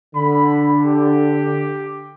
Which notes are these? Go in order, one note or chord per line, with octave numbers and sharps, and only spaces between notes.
D3 B5
G4